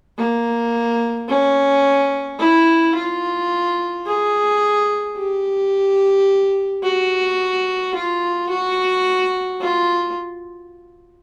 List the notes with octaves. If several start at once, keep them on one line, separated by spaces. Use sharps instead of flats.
A#3
C#4
E4
F4
G#4
G4
F#4
F4
F#4
F4